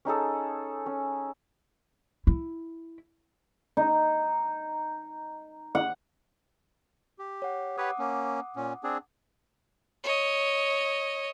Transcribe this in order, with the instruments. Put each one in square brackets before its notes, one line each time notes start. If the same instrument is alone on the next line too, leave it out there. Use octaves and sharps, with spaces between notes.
[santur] C#4 D#4 G#4 A4
C#4
[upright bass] E4
[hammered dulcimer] D#4
F#5
[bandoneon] G4
[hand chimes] C#5 F#5
[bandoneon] G4 B4 C#5 [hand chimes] F#5 D6 D#6
[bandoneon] A#3 C#4
A#2 C#4
C4 D4 G#4
[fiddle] C#5 D#5